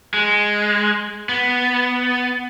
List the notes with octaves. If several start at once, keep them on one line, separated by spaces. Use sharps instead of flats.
G#3
B3